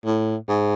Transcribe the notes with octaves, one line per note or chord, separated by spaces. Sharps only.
A2
G#2